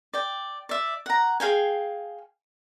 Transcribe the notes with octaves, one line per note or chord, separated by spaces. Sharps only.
D5 G5
D5 E5
F#5 A#5
G#4 F5 G5 G#5